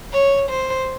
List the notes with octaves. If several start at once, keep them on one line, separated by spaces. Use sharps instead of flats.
C#5
C5